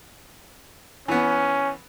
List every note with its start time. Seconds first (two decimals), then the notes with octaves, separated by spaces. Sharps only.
1.08 E3 B3 C#4